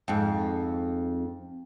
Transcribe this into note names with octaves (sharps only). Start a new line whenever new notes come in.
F2 G#2